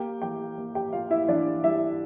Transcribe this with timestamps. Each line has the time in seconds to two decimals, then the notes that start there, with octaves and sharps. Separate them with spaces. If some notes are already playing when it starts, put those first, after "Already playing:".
Already playing: A#3 G4 G5
0.22 E3 G4 G5
0.58 A#3
0.75 G4 G5
0.93 A#3 F4 F5
1.11 E4 E5
1.28 E3 D4 D5
1.64 G3 E4 E5